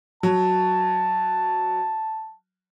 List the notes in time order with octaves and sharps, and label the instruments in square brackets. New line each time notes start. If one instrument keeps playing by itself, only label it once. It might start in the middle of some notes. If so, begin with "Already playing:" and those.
[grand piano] F#3 [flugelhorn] A5